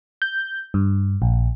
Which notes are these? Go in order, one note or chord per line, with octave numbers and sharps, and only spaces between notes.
G6
G2
A#1